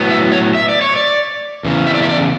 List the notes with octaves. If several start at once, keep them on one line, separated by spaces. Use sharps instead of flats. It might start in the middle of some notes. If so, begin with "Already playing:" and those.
Already playing: A2 F#3 B3
E5
C#5
E5
D5
C#5
D5
E2 C#3
E5
D5
E5
D5